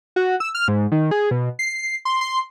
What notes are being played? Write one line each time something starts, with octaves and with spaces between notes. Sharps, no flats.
F#4
E6
F6
G#2
D#3
G#4
B2
C7
C6
C6